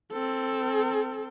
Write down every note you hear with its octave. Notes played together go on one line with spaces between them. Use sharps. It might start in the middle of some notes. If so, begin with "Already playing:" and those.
C4 A4